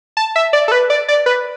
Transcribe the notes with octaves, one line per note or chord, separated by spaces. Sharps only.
A5
E5
D5
A4
B4
D5
D5
B4